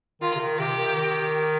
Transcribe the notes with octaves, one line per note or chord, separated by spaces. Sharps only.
D#3 F4
C3
D#3
C3 G4
D#3
D#3